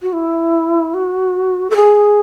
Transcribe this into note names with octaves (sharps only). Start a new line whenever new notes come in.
F#4
E4
F#4
A4
G#4